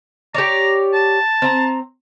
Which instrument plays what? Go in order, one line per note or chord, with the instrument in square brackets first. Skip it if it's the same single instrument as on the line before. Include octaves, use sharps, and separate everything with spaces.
[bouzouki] G4 C#5 D5 [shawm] A#5
[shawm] A5
[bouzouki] C4 A#5